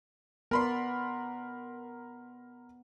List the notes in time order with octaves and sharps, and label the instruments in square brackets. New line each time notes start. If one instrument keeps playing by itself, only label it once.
[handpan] B3 D5 [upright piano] A#4 B5 C6